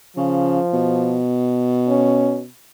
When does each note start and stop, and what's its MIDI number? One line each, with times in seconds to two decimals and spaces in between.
0.17 0.59 49
0.17 1.22 53
0.73 2.47 47
1.89 2.40 61